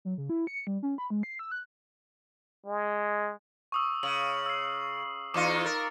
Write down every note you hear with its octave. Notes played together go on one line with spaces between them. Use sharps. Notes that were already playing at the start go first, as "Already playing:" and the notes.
F#3
C#3
E4
C#7
G3
C#4
B5
G#3
C7
E6
F#6
G#3
C#6 D#6 E6
C#3 F#7
E6 C7
E2 D#4 F4 D6 C#7
A#4 A6